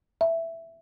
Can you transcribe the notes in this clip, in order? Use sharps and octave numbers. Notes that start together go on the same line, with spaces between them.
E5